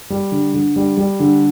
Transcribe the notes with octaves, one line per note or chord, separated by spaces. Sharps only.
G3
D3
D3
G3
G3
D3